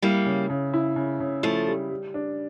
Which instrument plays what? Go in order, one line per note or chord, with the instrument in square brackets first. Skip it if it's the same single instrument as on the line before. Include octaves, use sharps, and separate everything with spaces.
[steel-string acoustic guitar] G3 A#3 [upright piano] E4
[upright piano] C#3
C#3
E4
C#3
C#3
[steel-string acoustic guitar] F3 A3 [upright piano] E4
[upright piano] G3
G3
D4